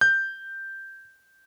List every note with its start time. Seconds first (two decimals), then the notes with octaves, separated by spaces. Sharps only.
0.01 G6